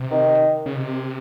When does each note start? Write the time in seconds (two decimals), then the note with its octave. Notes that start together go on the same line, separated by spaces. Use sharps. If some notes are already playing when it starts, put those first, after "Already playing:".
Already playing: C3
0.11 D#3
0.66 C#3
0.76 C3